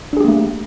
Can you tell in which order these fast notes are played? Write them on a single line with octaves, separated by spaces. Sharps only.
D4 G#4 G4 A#3 A3